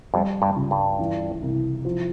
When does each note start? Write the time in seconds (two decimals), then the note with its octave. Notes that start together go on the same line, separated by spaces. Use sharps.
0.14 F2 G3
0.42 G2
0.56 C#2
0.71 G2
0.99 E3
1.42 C2
1.85 F3